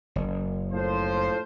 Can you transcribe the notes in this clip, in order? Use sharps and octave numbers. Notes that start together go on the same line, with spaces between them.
F#1
A2 F3 C5